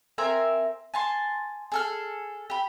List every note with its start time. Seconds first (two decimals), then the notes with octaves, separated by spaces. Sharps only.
0.18 C4 A#4 E5 G#5
0.94 G#5 A5 C6
1.72 G#4 A4 F6
2.50 G4 B5